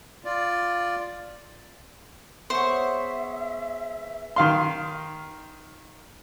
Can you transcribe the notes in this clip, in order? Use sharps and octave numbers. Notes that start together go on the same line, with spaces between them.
F4 D5
B3 G#4 C5 C#5 E5 C#6
D#3 F5 C6